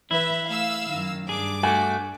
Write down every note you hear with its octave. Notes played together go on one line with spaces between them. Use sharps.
E3 E4 B4 E5
A3 F5 E6
F#2 D#3
G2 D4 G#4 D6
A3 F#4 G#5